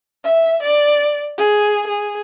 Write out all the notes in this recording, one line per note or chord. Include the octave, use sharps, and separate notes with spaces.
E5
D5
G#4
G#4